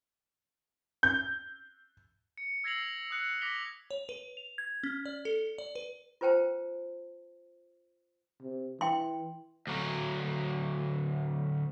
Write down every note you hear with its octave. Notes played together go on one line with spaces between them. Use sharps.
G6
C#7
E6 G#6 A#6 C7 F7 F#7
D#6 F#6 C#7
D6 A#6 B6 F7 G7
C#5
B4
F7
G#6
C#4
D5
A4
D5
B4
F4 B4 C5 G5 A5
C3
E3 G5 C6
D2 F#3